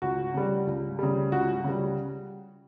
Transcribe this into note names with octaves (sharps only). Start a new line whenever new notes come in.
C#2 F#4
C#3 G3
C#2
C#3 G3
C#2 F#4
C#3 G3